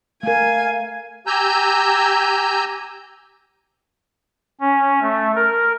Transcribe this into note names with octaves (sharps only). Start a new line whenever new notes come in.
A3 A#4 F5 G#5
G4 G#5 A#5 E6 G6
C#4
A3
A#4